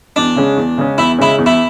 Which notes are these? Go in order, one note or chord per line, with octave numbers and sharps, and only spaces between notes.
E2 D4
C#3 G#3 C#4
E2
C#3 G#3 C#4
E2 E4
C#3 G#3 C#4 E4
E2
E4